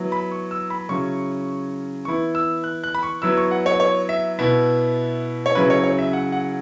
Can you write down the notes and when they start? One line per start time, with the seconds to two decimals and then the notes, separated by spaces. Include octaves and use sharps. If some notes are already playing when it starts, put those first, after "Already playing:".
Already playing: F#3 B3 E4
0.12 B5
0.31 C#6
0.51 E6
0.70 B5
0.89 C#3 F#3 C#4 E4 C#6
2.05 E3 B3 E4 C#6
2.35 E6
2.64 F#6
2.84 F#6
2.94 B5
3.03 C#6
3.22 F#3 B3 E4 E6
3.37 C#6
3.51 F#5
3.66 C#5
3.80 C#5
4.09 E5
4.39 B2 B3 E4 E5
5.46 C#5
5.55 C#3 F#3 C#4 E4 B4
5.70 C#5
5.84 C#5
5.98 E5
6.13 F#5
6.32 F#5